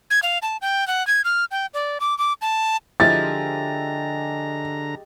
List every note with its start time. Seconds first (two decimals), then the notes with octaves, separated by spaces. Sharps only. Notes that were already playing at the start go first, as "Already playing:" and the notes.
0.10 G#6
0.23 F5
0.42 A5
0.62 G5
0.88 F#5
1.07 G#6
1.25 F6
1.51 G5
1.74 D5
2.00 D6
2.18 D6
2.42 A5
3.00 D3 F3 G#3 E4 G4 A#5 A6